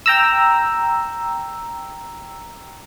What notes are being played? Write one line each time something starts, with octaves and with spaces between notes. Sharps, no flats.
G5 A#5 E6